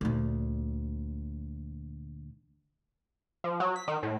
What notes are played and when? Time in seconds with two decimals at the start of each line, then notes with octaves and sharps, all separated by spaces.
0.01 D2 A#2
3.44 F3
3.60 F#3
3.76 B6
3.88 D#3
4.03 A2